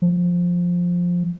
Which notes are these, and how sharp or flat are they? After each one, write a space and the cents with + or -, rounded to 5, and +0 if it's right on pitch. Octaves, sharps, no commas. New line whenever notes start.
F3 +10